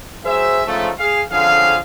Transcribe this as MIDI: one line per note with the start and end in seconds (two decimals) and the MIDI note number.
0.24 0.61 54
0.24 0.61 68
0.24 0.61 72
0.24 0.61 76
0.66 0.90 44
0.66 0.90 49
0.66 0.90 53
0.66 0.90 57
0.98 1.21 68
0.98 1.21 77
1.31 1.78 41
1.31 1.78 50
1.31 1.78 53
1.31 1.78 61
1.31 1.78 68
1.31 1.78 77